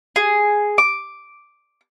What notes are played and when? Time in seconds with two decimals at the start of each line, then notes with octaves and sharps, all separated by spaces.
0.16 G#4
0.78 D6